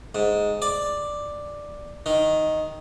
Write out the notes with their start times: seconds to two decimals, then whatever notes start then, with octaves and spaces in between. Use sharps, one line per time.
0.15 G#2
0.62 D5
2.06 D#3